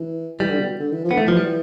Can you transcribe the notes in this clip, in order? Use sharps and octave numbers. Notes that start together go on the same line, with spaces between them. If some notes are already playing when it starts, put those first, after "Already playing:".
Already playing: E3
E3 G3
D3
B2
D3
E3
F3
D3 B3
E3 A3
F3
G3